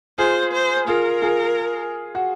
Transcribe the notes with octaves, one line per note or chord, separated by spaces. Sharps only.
F4 G#4 C5
C5
F4 G#4 A#4
F4 G#4
F#4